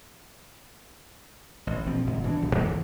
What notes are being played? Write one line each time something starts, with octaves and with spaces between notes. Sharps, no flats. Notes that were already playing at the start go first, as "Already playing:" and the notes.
A1
A#1 B2 F3 C4
D#1 G#2 C#3
B2 E3 B3 D4
D#1 C2 F#3
E2 G#2 E3